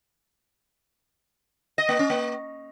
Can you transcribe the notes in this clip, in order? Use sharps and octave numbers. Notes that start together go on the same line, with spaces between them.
D#5
A#3
C#4
A#3